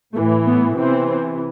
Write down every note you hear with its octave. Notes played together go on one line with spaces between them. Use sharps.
A2 E3 A3
B3
C3 E3 C4